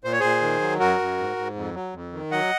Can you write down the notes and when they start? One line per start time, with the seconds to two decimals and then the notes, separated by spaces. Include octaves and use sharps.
0.04 A#2 C5
0.12 C#5
0.20 A#2 G#4 C5
0.42 D#3
0.61 F#3
0.80 F#2 F#4 A#4
0.99 F#2
1.18 G#2
1.37 G#2
1.55 F2
1.75 F#3
1.94 F2
2.13 D#3
2.31 F#3 D#5 F#5